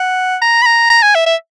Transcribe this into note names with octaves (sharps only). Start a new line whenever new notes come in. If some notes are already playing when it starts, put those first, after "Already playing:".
Already playing: F#5
A#5
B5
A#5
A#5
G#5
E5
E5